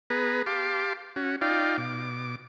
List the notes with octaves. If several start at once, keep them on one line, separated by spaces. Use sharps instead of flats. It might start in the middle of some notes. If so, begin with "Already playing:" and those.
B3 G#4 B4 A#5
G4 F5 A5 C6 D6
C#4 F#4
D#4 F4 D5 F5 G5
B2 D6